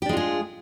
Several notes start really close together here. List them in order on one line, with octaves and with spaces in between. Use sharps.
G4 D4 G#3 F4 G#4